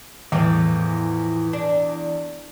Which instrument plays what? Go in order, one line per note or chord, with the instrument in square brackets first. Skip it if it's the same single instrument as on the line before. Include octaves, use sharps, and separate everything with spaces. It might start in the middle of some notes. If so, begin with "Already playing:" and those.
[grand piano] E2 [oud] A2 E3 F3
[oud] D4